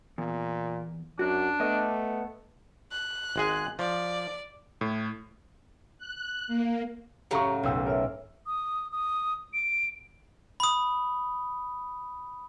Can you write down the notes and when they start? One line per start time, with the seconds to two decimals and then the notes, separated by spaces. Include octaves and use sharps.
0.18 E2 A#2
1.19 F#2 D4 F#4
1.60 A3 B3 D#5
2.92 F#6
3.36 G#1 G#3 G#4
3.79 F3 D5
4.81 A2
5.98 F#6
6.48 A#3
7.31 A2 C#3 F#3 G4 A#5 C#6
7.63 B1 G#2 F5 G5 E6
7.87 A#4 C#5 E5
8.47 D#6
8.92 D#6
9.53 D7
10.60 B5 D#6